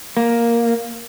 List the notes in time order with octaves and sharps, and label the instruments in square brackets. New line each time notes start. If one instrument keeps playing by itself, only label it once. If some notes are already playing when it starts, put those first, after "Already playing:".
[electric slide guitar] A#3